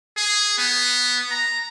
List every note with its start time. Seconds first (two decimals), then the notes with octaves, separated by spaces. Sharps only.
0.17 G#4
0.58 B3
1.31 A#5